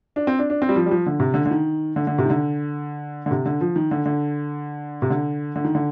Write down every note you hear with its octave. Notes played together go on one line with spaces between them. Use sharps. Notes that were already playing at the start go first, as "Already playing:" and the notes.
D4
C4
D4
D4
C4
G3
F3
G3
F3
D3
C3
D3
D3
D#3
D3
D3
C3
D#3
D3
D3
C3
D3
F3
D#3
D3
D3
C3
D3
D3
D#3
D3